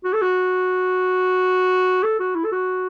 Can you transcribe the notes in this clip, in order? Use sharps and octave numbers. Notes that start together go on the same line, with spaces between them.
F#4
A4
F#4
A4
F#4
E4
A4
F#4